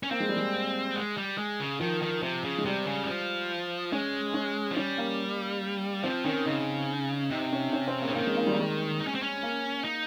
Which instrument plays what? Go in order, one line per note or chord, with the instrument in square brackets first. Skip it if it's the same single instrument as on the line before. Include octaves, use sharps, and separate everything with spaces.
[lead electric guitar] C#4
[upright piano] A#3 [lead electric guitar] C4
[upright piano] G#3
G3
G#3
[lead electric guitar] G#3
G3
G#3
C#3
[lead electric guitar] D#3 [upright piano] F3
[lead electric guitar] D#3
C3
C#3
[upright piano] G#3
[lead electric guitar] C3 [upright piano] G3
[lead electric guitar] C#3
G3
F3
[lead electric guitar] G#3 [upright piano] C#4
[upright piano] C#4
[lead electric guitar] F3
[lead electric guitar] G3 [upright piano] C#4
[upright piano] A#3
[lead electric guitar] F3 [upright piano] C4
[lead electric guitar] D#3 [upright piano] C#4
[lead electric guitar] C#3 [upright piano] D#4
[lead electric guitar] C3 [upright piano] D#4
[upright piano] C#4
C#4
C4
[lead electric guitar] C#3 [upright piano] A#3
[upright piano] C4
[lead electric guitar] D#3 [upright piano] A#3
[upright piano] G#3
A#3
G3
A#3
G#3
[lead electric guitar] D#4
C#4
C4
C#4
[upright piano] A#3
[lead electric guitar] D#4